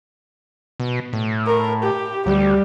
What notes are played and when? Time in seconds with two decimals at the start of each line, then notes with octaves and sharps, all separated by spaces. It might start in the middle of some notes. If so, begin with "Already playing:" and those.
0.80 B2
1.13 A2
1.46 A#4
1.83 G4
2.26 D2 G3 G4